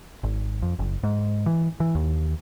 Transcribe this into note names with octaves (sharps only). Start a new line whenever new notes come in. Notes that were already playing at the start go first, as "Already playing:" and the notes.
G#1
F2
F#1
G#2
E3
E3
D#2